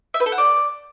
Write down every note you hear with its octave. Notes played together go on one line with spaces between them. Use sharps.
E5
B4
A4
F#5
D5